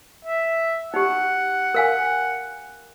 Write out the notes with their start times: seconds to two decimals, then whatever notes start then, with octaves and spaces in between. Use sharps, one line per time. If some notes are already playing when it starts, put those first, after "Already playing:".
0.25 E5
0.94 D#4 G4 F#5
1.74 A#4 F5 G#5